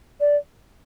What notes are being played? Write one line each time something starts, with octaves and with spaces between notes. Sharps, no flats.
D5